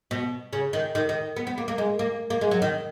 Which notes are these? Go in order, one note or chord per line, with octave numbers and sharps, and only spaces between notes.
B2
C#3
D#3
D#3
D#3
B3
B3
A#3
A#3
G#3
A#3
A#3
G#3
F#3
D#3